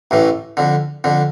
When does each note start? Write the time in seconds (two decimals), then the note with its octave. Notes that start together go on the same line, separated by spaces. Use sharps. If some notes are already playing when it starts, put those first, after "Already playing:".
0.11 A1 A2 E3
0.57 F2 D3
1.04 F2 D3